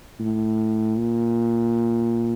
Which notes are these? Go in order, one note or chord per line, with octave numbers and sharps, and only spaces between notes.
A2
A#2